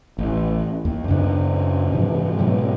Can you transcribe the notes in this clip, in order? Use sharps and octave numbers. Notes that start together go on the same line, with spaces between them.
A1
D#2
F#2 C#3 B3 D4
G#2 C3 E3 F3
G#2 B2 F#3